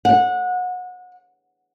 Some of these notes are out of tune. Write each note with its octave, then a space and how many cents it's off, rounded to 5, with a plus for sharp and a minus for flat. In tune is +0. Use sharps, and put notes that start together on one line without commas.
F#5 -25